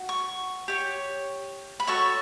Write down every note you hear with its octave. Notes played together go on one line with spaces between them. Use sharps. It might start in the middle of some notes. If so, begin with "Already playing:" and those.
Already playing: F#4
C#6
G4 C#5
B5
F#4 A4 C#5 C#6